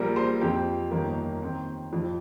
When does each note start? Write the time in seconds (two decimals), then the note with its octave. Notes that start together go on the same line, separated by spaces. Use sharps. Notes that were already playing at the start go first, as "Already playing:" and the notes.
Already playing: A#1 A#2 G3 A#4
0.16 C5
0.41 F2 F3 C4 G4
0.91 G1 F2 D#3 A#3
1.41 D#2 D#3 C4
1.93 F1 F2 F3